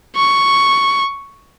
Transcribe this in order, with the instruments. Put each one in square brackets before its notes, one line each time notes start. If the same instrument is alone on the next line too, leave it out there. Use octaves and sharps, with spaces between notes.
[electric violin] C#6